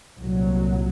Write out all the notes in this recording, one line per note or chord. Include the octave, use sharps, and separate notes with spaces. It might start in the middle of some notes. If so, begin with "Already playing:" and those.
C2 A#2 F#3